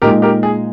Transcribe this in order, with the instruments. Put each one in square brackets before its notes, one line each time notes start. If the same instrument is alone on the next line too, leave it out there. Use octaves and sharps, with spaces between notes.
[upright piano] A#2 G#3 D#4 [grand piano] G4 A#4
[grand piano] G4 A#4
G#4